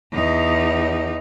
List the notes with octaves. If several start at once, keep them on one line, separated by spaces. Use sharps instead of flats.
E2 D#4